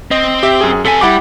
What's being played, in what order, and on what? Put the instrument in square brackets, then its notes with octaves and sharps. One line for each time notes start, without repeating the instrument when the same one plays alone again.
[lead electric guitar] C4 [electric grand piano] D#5
[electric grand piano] G4 E5
F#2 G#4
[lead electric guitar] C3 G#5 [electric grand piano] A4 B6 D#7
[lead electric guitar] G3 [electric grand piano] E4 F#5 D6